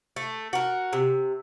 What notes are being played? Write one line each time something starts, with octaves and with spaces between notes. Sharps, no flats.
A3
F#4 A#4
C3